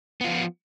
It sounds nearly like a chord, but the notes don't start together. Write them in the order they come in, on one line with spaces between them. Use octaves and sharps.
B3 F4 F3